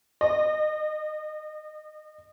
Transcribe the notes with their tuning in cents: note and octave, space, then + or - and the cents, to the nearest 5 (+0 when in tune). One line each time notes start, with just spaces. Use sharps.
D#5 -35